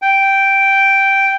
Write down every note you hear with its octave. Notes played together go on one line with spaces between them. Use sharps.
G5